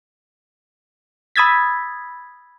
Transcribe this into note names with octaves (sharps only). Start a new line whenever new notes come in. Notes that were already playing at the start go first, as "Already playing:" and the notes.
B5 D#6 E6 G#6 A6 B6